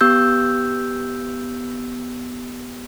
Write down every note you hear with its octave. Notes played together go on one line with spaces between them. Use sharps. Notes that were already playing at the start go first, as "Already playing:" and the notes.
B3 G4 E6 G6